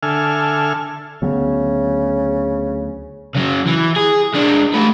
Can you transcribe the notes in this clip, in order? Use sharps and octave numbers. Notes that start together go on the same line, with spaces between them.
D3 A4 E5 G#5 F6
D2 C#3 F#3 B3
C#3 F#3
E3
G#4
G#3 D4
A3 B4